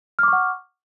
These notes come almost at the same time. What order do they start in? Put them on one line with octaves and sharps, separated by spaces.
F6 D6 C#6 F#5